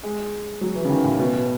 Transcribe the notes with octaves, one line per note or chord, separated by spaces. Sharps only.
G#3
F#3
E3
C#3
D#3
A2
B2